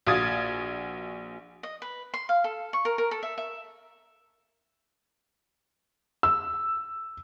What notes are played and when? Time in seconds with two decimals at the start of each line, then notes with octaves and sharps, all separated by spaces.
0.07 A#1 F#4 F5 D#6 G#6 A6
1.63 D#5
1.82 B4
2.14 C6
2.29 F5
2.44 A4
2.73 C#6
2.85 A#4
2.98 A#4
3.11 A4
3.23 E5
3.38 E5
6.23 E6